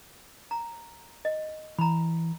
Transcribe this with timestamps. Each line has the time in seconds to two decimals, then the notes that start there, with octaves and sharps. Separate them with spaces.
0.51 A#5
1.25 D#5
1.79 E3 A#5 B5